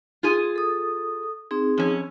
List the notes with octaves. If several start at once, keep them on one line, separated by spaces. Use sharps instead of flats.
F4 G#4 G#5
A4 D#6
C4 D#4 G#4
F2 C#4